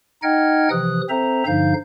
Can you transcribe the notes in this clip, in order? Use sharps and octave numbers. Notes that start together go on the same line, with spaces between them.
D#4 D#5 F#5 G5 F6 G#6
C3 E3 F3 D#6 F#6
C4 A4 C5 E5 A#5
G2 D3 F3 D#4 F5 G6